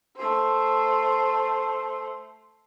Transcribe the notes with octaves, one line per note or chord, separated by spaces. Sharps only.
A3 C5